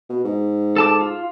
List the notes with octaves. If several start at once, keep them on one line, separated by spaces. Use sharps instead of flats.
B2
G#2
A4 A5 D6
F4